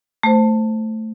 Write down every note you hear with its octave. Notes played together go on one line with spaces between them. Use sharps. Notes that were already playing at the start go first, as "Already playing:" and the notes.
A3 C5